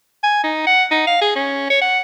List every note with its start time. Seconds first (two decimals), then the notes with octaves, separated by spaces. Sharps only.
0.24 G#5
0.44 D#4
0.67 F#5
0.91 D#4
1.07 F5
1.22 G#4
1.36 C#4
1.70 C#5
1.81 F#5